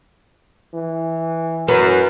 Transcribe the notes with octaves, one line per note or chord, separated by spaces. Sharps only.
E3
F#2 B4